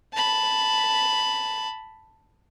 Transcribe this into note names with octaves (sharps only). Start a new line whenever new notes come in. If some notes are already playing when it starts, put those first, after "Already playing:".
A5 B5